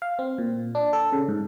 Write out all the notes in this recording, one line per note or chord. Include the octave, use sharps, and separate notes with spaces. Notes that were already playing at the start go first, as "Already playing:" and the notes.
F5
C4
A#2
D4
A4
C#3
G#2